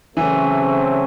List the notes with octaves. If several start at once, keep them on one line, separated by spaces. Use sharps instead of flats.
C#3 E3 F#3 A3 C4